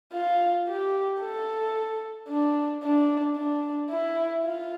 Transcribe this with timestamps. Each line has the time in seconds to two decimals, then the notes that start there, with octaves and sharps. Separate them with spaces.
0.13 F4
0.68 G4
1.22 A4
2.28 D4
2.83 D4
3.36 D4
3.90 E4
4.44 F4